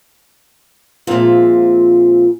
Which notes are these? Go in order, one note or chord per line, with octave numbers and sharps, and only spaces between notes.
A#2 F3 G#3 C4 F4 E5